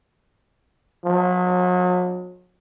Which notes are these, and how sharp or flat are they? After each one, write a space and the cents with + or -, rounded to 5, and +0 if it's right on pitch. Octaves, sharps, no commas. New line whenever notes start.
F#3 -40